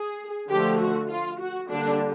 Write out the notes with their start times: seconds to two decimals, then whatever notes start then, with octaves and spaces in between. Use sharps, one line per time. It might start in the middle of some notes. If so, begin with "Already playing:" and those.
Already playing: G#4
0.49 D3 F3 A3 G4
0.79 F#4
1.10 F4
1.40 F#4
1.70 D3 G3 A#3 D4